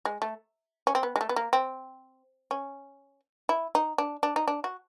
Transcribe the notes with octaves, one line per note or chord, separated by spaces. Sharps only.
G#3
A3
C#4
C4
B3
G#3
A3
B3
A#3
C4
C#4
E4
D#4
D4
D4
D#4
D4
F#4